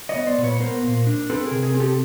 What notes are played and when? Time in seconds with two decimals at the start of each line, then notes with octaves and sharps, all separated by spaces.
0.09 C#5 D#5
0.16 B3
0.27 C5 D5
0.38 A#2
0.44 B4 C#5
0.60 B3 A#4 C5
0.83 A#2
1.07 D4
1.30 C4 A4 B4
1.46 G#4 A#4
1.51 C3
1.63 G#4 A#4
1.74 C4
1.80 G4 A4